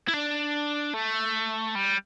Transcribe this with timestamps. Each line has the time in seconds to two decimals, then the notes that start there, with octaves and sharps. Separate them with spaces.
0.08 E4
0.14 D4
0.94 A3
1.75 G3